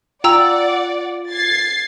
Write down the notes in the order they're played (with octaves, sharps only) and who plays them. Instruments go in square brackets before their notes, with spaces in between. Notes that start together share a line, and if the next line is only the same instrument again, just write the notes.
[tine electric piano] F4 [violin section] D5 F#5 [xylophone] G5 A#5 E6
[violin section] G#6 A6 C7